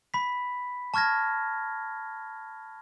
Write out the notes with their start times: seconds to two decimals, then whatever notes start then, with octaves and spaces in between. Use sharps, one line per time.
0.14 B5 B6
0.94 A5 C#6 F6 G#6 A#6